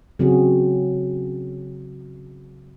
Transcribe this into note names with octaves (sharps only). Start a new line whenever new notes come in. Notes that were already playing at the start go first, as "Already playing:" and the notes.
C#3 F#3 C4 F#4 G#4